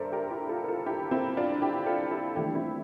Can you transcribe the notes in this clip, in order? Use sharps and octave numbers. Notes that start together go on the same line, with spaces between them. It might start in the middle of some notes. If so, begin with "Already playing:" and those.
Already playing: G2 A4 A#4 C5 D5 E5
G4 A#4
E4 G4
F4 A4
A#4
F4 A4
E4 G4
C4 E4
D4 F4
E4 G4
F4 A4
E4 G4
G2 E3 A3 E4 G4
C4 E4